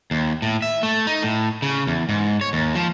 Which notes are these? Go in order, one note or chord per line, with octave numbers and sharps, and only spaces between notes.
D#2
A2
E5
A3
D#4
A2
C#3
E2
G#2
C#5
D#2
F3